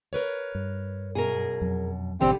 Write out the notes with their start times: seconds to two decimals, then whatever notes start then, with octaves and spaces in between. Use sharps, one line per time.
0.13 A#4 B4 C#5
0.55 G2
1.15 F#2 B2 G#4 A#4
1.61 F2 F#3
2.21 G#1 B2 D3 E3 G3 C4 G4